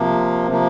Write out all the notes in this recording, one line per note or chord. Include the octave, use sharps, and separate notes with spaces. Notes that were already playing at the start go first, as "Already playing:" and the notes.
Already playing: C3 F3 A#3
C3 F3 A#3